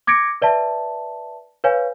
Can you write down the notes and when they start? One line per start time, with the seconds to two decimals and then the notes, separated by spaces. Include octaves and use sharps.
0.07 D6 G#6 A#6 C#7 D7
0.42 B4 D5 E5 A5
1.64 B4 C#5 F5 G#5